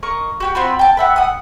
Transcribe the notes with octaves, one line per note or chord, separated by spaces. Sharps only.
A#3 D#5 C#6
F#4 G4 G5
C4 F4 F#4 B4
G5 A5
B4 E5 F#5
F#5 G#5 D#6